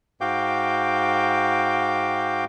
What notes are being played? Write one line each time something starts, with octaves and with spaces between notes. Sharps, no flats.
G#2 F#4 F5 G5 D6 G6